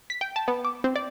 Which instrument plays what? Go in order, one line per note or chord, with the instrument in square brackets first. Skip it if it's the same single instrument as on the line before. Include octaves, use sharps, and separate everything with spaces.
[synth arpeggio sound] B6
G5
A5
B3
D6
C4
D5